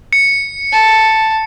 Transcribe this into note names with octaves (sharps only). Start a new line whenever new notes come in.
C#7
A5